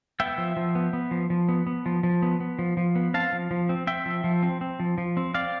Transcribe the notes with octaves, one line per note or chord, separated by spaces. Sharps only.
B3 E5 G5
F3
F3
B3
B3
F3
F3
B3
B3
F3
F3
B3
B3
F3
F3
B3
C4 F5 A5
F3
F3
C4
C4 E5 G5
F3
F3
C4
C4
F3
F3
C4
C4 D5 F5